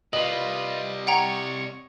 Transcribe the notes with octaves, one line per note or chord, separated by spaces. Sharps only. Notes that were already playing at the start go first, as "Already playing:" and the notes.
C3 G3 F4 B4 D#5 F#7
C#5 F#5 G5 A#5 C#6